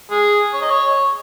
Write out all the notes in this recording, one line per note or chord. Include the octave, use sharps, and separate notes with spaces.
G#4
C#5
D#5
C#5